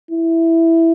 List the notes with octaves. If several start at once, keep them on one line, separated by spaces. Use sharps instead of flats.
E4